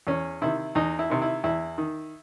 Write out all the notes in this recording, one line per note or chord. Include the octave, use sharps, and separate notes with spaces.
E2 C#4
C3 D#3 E4
E2 D#4
E4
C3 D#3
E4
E2 E4
D#3